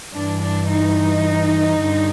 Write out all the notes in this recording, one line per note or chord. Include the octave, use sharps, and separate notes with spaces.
G2 E3 D4
D4
D#4
G2 D3